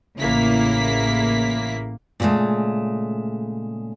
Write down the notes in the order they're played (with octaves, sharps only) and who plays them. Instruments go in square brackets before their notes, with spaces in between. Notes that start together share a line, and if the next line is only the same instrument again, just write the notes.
[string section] A1 C#3 A#3 E4 B6
[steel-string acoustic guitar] A#2 C#3 E3 G#3 A3